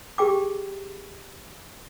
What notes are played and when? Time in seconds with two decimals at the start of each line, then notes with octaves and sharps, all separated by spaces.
0.18 G4 G#4 G5 D6